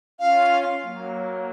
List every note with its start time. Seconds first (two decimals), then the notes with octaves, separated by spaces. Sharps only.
0.20 C#4 F4 F5
0.83 F#3 A#3